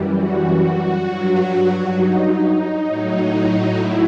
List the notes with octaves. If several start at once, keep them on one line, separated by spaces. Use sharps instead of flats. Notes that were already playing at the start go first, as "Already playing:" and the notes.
Already playing: F#2 E3 G3
F#4
G2 F#3
D#4
A2 F#3
E4